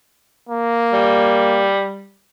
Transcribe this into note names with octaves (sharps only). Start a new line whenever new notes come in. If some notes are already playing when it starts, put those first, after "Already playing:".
A#3
G3